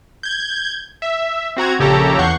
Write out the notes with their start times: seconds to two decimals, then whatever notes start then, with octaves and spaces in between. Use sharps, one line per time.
0.23 G6 G#6
1.02 E5
1.56 C4 F#4 A#5 G#6
1.79 A#1 C#3 G4 A4 C#5 A#5
2.18 E2 F#5 C#6 G6 C7